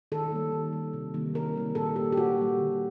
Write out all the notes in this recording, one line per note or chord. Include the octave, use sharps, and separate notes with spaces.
D#3 A4
G3 A#3
D#3
G3 A#3
C3
D#3 G3 A#3
C3 A#4
D#3 G3 A#3
A#2 A4
G3 A#3 G4
G4
A#2 F#4
G3 A#3
D3